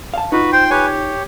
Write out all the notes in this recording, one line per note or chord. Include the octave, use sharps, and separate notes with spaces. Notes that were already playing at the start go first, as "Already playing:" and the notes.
F5 A5
D#4 F4 F#4 B4
C5 G5 C6
G4 B4 C#5 G#5
C#5